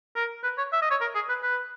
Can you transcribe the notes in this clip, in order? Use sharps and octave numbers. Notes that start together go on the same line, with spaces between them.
A#4
B4
C#5
E5
D#5
C#5
A#4
G#4
B4
B4